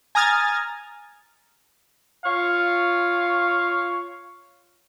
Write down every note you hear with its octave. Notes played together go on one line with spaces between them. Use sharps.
G#5 A#5 D#6 F6 G#6 A6
F4 C#5 F5